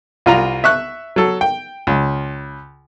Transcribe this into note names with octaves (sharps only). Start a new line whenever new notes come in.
C2 F4 A#5
E5 C#6 F#6
F#3 A4
G5
C#2